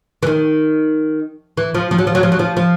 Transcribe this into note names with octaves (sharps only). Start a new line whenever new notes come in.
E3
D#3
E3
F3
F3
F#3
F3
F#3
F3
F#3
F3
F3